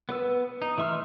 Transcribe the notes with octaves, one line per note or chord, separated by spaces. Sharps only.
B3 B4 E6
D#4
E3 A3 E5 C6 F6